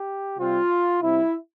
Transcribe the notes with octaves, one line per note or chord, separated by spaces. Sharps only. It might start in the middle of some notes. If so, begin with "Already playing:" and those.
Already playing: G4
C3 G3 C4 F4
C3 G3 C4 E4